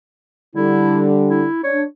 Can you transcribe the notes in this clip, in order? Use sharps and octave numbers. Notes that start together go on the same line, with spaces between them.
D3 G3 E4
E4
D4 C#5